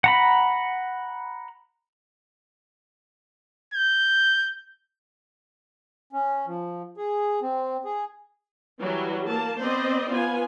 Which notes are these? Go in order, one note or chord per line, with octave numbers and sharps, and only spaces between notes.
F#5 A#5 B5
G6
C#4
F3
G#4
C4
G#4
E3 F#3 G3 F#4
A#3 A5
B3 C4 C5 D5 D#5
B3 F4 G#5